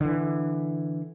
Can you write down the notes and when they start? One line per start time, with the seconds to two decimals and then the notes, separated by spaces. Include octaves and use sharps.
0.01 D3 E3